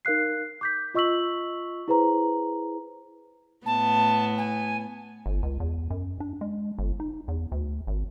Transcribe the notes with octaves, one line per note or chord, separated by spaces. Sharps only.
D#4 A#4 F5 F#6 C7
D6 G6 B6
F4 D#5 C#6 E6 B6 F#7
E4 G#4 B4 C5 A#5
A2 B3 A5
G#5
G1
C#2
E2
F#2
D4
G#3
G1
D#4
E2
D2
G#1